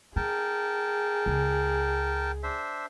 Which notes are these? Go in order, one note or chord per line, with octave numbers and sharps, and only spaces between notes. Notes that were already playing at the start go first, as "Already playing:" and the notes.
D4 G#4 A#4 G5 A5
C#2
D4 C5 E5